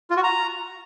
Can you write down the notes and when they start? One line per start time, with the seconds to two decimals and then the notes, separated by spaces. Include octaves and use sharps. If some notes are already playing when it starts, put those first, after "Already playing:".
0.10 F4
0.17 F#4
0.23 A#5